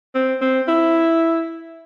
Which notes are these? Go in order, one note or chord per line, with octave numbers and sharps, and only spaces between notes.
C4
C4
E4